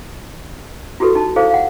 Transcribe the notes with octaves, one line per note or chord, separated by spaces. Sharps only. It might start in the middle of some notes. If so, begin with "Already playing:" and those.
E4 F#4 G4 A4 B4
D#4 A5
E4 G#4 A4 C5 F5
F5 F#5